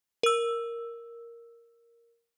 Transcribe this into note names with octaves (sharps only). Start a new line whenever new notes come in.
A#4 E6